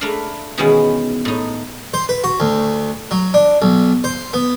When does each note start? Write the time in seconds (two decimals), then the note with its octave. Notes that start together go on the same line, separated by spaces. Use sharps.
0.01 A3 D4 A#4 B4 E5 F5
0.58 B2 D#3 E3 G#3 B3 C#4
1.25 A2 D#4
1.94 C5
2.09 B4
2.24 F#4
2.40 D2
3.11 F#3
3.34 D4
3.62 B1
4.04 C5
4.33 B3